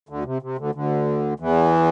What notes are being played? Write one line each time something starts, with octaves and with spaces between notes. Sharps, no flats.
D2 D3
C3
C3
D2 D3
D2 D3
E2 E3